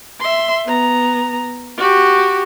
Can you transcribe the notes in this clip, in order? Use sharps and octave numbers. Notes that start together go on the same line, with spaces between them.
E5 C6
B3 A#5
F#4 G4